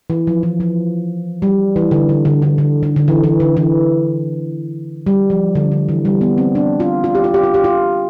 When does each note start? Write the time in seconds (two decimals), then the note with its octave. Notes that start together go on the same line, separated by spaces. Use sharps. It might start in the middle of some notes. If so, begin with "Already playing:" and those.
0.10 E3
0.27 F3
0.43 E3
0.60 F3
1.42 G3
1.76 E3
1.91 D3
2.09 D3
2.25 D3
2.42 D3
2.58 D3
2.83 D3
2.96 D3
3.08 E3
3.24 E3
3.40 D3
3.57 E3
5.06 G3
5.30 F3
5.55 D3
5.72 D3
5.89 E3
6.05 G3
6.21 B3
6.38 C4
6.55 D4
6.80 F4
7.04 F4
7.15 G4
7.24 F4
7.34 G4
7.43 F4
7.54 G4
7.64 F4